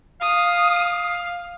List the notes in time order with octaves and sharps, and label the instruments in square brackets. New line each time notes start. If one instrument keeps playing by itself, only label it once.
[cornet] F5 [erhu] D#6